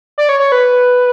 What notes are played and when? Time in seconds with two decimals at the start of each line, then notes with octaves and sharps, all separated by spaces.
0.18 D5
0.29 C#5
0.40 C#5
0.52 B4